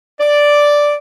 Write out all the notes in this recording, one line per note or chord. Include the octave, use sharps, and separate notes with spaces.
D5